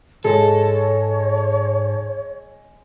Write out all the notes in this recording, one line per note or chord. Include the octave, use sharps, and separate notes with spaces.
G#2 G#3 A4 C#5